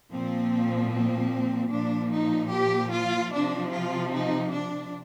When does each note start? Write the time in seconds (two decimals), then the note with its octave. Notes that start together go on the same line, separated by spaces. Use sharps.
0.12 A#2 F3 C4
0.92 C4
1.72 A#2 F3 D4
2.13 D#4
2.52 G4
2.93 F4
3.33 C3 F3 D4
3.73 F4
4.13 D#4
4.53 D4